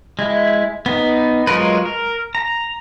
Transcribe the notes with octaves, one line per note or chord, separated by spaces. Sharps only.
G#3 E4
B3 D#4
F#3 G#3 F4 A#4 B4
A#4
A#5